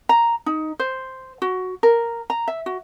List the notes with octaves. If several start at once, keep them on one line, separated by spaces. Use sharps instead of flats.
A#5
D#4
C5
F#4
A#4
A#5
E5
F#4